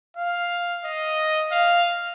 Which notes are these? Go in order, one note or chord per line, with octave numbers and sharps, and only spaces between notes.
F5
D#5
F5